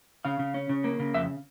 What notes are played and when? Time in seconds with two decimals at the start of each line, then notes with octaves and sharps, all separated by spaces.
0.25 C#3 F5
0.39 C#3
0.54 C#4
0.69 C#3
0.84 A#3
0.99 C#3
1.14 F2 E5